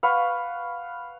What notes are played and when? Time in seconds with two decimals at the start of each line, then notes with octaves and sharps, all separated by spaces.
0.03 B4 F5 F#5 C#6